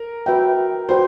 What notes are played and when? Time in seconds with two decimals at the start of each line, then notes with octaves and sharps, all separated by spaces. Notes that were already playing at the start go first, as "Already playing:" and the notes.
Already playing: A#4
0.26 F#4 B4 E5 G5
0.89 F#4 B4 C5 D5 G5